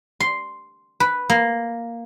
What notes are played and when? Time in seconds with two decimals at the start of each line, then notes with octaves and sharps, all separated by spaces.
0.20 C6
1.00 B4
1.30 A#3